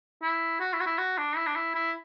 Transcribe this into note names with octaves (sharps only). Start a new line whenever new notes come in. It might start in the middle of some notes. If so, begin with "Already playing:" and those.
E4
F#4
E4
F#4
E4
F#4
D4
E4
D4
E4
E4